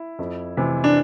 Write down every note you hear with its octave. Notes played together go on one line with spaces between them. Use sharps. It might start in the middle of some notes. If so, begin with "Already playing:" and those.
Already playing: E4
F2
C3 E3
D4